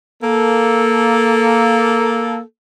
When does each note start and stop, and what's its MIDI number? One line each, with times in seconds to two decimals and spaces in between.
0.23 2.41 58
0.23 2.41 69